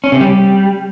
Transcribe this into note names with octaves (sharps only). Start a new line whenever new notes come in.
C#4
C3
G3